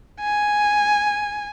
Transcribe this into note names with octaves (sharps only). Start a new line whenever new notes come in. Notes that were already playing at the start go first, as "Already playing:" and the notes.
G#5